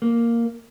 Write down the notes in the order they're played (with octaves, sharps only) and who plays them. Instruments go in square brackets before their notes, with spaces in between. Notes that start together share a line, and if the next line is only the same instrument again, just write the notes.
[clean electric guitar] A#3